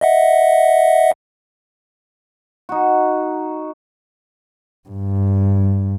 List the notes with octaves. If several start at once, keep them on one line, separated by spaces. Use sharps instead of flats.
D#5 E5 F#5
D#4 F#4
G2